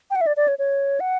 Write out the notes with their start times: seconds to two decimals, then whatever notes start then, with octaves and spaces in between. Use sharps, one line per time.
0.11 G5
0.16 F#5
0.21 E5
0.27 D5
0.37 D5
0.48 C#5
0.59 C#5
1.00 F#5